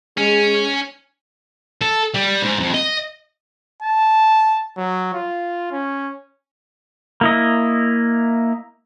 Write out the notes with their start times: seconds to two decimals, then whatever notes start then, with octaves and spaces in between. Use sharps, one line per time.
0.18 G#3 C#4
1.81 A4
2.14 G3
2.42 G#2
2.59 F2
2.74 D#5
3.83 A5
4.77 F#3
5.14 F4
5.72 C#4
7.21 A#3 E4 D#5